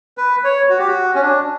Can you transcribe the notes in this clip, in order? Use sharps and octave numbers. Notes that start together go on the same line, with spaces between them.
B4
C#5
F#4
G4
F#4
C#4
D4